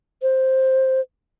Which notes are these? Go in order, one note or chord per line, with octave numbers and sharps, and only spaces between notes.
C5